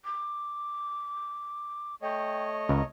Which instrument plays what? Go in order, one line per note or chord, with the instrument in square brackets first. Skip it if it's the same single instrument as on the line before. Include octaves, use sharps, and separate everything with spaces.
[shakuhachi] D6
[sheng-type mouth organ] A3 C#5 D#5 [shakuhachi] G5
[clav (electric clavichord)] C#2 [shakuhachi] A#5